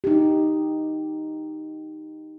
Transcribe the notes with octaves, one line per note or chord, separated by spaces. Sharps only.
D#4 G4